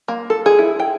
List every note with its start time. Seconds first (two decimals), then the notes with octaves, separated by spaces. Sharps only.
0.08 A#3
0.30 A4
0.46 G#4
0.59 E4
0.80 G5